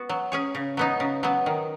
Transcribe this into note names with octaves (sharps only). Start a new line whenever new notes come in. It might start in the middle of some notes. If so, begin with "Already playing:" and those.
Already playing: B3 F#4
F#3
C#4 G#4 C#5
C#3
F#3 B3 D#4
C#3
F#3 B3
D#3